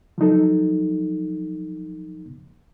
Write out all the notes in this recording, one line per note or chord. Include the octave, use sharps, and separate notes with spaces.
F3 F#3 D#4 A4